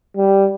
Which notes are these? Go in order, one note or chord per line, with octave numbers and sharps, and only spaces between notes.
G3